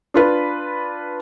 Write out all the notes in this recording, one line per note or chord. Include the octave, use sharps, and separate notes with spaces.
D4 F4 B4